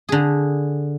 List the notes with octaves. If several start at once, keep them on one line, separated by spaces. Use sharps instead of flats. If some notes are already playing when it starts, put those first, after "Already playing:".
D3 G#4